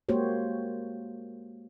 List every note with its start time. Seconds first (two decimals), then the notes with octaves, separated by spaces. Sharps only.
0.09 G#3 A#3 F#4 G4 C5 C#5